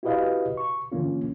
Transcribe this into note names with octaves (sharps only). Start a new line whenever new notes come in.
E4 F#4 G4 B4 D#5 F5
C#6
G2 D3 E3 A#3 C#4 F4